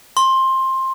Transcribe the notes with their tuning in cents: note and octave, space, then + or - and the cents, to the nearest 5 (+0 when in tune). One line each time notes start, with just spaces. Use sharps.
C6 +15